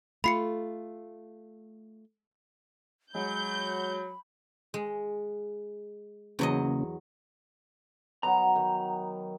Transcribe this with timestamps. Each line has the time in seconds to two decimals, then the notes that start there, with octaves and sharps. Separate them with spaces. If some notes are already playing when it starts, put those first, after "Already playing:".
0.24 A3 F4 B5 C7 C#7
3.15 F#3 G#3 B5 G6
4.74 G#3
6.39 E2 C#3 F#3 A#3 C#4 D#5
8.23 F#3 B3 D#4 A#5
8.55 D#3